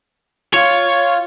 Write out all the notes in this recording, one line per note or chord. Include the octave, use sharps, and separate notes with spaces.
F4 C#5 F5